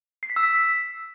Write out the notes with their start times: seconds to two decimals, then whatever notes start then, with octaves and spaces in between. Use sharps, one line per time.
0.23 C7
0.30 B6
0.36 E6
0.43 B6